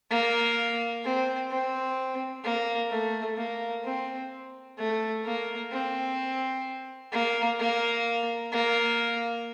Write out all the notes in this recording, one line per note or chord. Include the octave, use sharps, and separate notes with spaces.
A#3
C4
C4
A#3
A3
A#3
C4
A3
A#3
C4
A#3
A#3
A#3